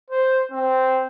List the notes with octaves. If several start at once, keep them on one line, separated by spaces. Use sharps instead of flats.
C5
C4